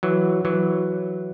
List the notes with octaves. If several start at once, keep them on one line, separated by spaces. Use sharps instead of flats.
E3 F#3
E3 F#3